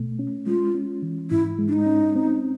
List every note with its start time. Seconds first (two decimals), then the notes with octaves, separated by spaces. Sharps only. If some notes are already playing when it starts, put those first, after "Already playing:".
Already playing: B2 A3
0.19 C#4
0.47 G#3 F4
0.75 C#4
1.02 E3
1.30 G#2 E4
1.59 G#3
1.68 D4
1.73 D#4
1.86 C#4
2.16 C4